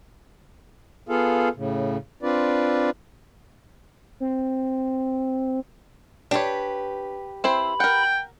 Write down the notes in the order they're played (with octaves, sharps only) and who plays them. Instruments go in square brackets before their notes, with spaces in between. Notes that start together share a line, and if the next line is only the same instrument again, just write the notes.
[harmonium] B3 F4 G#4 A4 F5
A2 C#3
C4 D4 F4 B4 D5
[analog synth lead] C4
[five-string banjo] D4 C#5 [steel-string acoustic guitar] G4 B4
[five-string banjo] C4 E4 C5 [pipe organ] B5
[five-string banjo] A#4 F#5 [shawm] G5